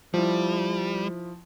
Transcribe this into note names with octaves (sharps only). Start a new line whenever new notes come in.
F3 G3 E4